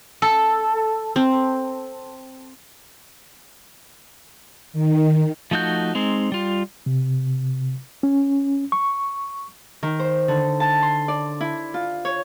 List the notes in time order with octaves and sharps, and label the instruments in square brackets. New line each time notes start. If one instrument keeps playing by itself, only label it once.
[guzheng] A4
[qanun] C4
[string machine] D#3
[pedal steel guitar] F3 A3 D#4 F#4 G6
G#3 C4 D#4
G3 F4
[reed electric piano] C3
C#4
C#6
[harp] D#3
C5
D3
A5
C6
D5
E4
F4
C#5